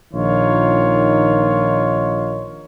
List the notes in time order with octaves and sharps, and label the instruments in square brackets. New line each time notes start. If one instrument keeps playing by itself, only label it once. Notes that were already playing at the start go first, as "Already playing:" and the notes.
[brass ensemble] A#1 D#3 D#4 F4 C#5